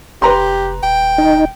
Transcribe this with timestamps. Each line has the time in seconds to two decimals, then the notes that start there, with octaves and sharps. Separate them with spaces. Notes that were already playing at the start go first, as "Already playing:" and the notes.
0.22 F1 G4 B4 A#5 C6
0.83 D#1 G5
1.18 D#4